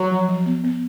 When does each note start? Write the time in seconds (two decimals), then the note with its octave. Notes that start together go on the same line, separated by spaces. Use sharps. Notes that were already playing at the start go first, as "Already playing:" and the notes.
Already playing: F#3
0.11 F3
0.29 F3
0.46 B3
0.64 B3